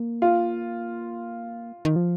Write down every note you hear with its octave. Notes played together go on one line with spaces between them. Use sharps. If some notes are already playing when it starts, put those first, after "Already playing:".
Already playing: A#3
F4
D#3
F3